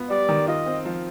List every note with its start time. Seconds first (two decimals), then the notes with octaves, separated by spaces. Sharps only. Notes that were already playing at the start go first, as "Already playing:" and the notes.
Already playing: B3 F4
0.10 G3 D5
0.29 D#3
0.47 F4 D#5
0.66 C4
0.85 F3